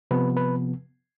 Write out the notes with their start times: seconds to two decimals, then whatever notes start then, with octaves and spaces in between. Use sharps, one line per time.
0.11 C3 F3 B3 B4
0.37 B4